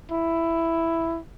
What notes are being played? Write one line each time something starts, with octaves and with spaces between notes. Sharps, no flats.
E4